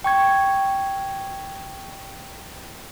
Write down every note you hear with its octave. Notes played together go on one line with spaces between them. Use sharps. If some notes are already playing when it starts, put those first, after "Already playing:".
G5 C#6 G#6